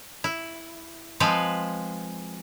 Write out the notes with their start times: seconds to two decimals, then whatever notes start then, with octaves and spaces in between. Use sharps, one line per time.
0.24 E4
1.20 F3 G#3 C4 B4 F5